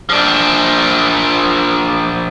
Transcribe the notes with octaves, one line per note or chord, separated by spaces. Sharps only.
F3 D4